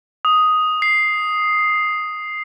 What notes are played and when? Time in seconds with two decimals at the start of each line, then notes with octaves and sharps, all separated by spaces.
0.25 D#6
0.82 C7